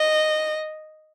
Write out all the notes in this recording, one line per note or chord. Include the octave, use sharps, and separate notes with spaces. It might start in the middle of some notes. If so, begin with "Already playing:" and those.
Already playing: D#5